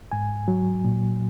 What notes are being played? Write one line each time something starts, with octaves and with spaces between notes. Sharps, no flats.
G#2 G#5
F#3
A#2